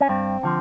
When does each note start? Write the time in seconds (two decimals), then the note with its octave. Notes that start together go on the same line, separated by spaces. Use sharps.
0.01 C#4
0.09 G2 C4
0.43 D3 F3